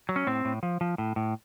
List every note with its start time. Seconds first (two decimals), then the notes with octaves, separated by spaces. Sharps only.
0.09 F#3
0.16 C#4
0.27 A2 C4
0.45 A2
0.63 F3
0.81 F3
0.98 A2
1.16 A2